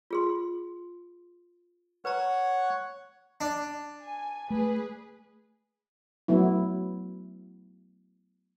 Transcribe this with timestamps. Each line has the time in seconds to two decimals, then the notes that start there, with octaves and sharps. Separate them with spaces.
0.11 F4 G#4 C6
2.05 B4 C#5 F#5 A#5
3.41 D4
4.04 G#5
4.50 A3 G#4 B4
6.28 F#3 A3 B3 E4